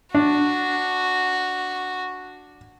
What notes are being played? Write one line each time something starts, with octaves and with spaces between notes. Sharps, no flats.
D4 F#4